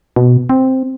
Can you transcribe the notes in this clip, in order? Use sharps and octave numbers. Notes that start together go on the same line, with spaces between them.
B2
C4